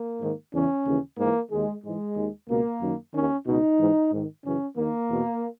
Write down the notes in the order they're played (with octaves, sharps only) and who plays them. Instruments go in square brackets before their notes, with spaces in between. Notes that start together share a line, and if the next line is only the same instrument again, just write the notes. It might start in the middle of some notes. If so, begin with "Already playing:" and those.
Already playing: [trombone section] A#3
G#2 D#3
E2 C#3 E3 C#4
D#2 C#3 E3
G#2 E3 A#3
D#2 D#3 G#3
G#2 E3 G#3
D#2 D#3
C#2 B2 A#3
F#2 D#3
D#2 D#3 C#4
C#2 B2 D#4
G#2 E3
G#2 D#3
F#2 C#3 E3 C#4
D#2 D#3 A#3
E2 B2